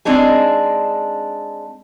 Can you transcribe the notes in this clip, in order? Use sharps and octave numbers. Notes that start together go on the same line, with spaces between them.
G#3 C4 D4 D#4 G#4